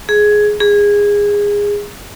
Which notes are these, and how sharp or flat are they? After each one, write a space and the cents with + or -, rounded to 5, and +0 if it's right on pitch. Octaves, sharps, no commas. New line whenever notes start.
G#4 +10
G#4 -20